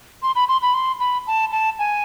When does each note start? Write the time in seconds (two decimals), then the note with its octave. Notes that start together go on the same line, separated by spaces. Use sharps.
0.23 C6
0.35 B5
0.48 C6
0.62 B5
0.74 C6
1.00 B5
1.27 A5
1.52 A5
1.79 G#5